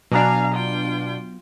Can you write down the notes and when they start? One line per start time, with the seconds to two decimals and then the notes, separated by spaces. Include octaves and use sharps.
0.12 B2 F#3 B3 D4 F5 G#5 A#5
0.53 F4 G5